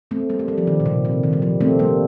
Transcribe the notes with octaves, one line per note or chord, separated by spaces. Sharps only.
A3 C4
G3 A#3
A3
G3
F3
D#3
A#2
C3
C3
D#3
G3
F3
A3 C4
G3 A#3